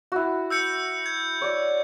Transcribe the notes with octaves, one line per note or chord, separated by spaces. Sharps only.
E4 F#4
E6 G6 C#7
G#6
C#5 D5